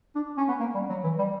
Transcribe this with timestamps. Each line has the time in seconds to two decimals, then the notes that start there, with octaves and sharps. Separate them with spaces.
0.15 D4
0.37 C#4
0.48 B3
0.60 A#3
0.74 G3
0.90 F#3
1.04 E3
1.19 G3